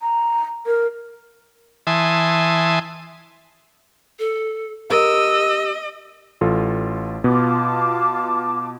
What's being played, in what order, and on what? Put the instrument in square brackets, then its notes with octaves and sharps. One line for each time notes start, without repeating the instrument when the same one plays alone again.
[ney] A#5
A#4
[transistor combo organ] E3 E5 G#5 A5 C6 D#6
[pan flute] A4
[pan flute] G4 [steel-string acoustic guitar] A#4 [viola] D#5 [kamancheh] E6
[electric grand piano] A1 F4 A4
[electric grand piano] B2 B3 [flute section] F4 A5 D6